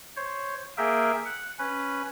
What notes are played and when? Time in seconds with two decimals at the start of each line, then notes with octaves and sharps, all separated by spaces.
0.16 C5 C#5
0.78 A#3 G#4 A#4 E5 G5
1.25 F#5
1.59 C#4 B4